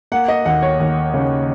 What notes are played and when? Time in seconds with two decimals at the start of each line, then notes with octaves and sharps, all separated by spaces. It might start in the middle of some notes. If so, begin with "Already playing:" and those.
0.12 A#3 F#5
0.28 D#5
0.45 D#2 F#5
0.63 C#5
0.80 D#2
1.14 C#3